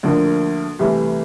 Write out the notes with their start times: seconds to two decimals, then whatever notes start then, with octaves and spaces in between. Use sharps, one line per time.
0.03 D2 D3 F3 A#3
0.79 C2 C3 E3 A3